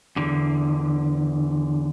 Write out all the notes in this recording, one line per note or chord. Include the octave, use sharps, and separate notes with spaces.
E2 D3